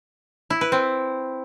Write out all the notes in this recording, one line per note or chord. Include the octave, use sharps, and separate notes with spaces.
E4
B4
C4